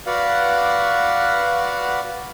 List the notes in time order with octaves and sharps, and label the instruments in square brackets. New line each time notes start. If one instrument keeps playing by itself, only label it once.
[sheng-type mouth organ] F#4 B4 D5 F5 F#5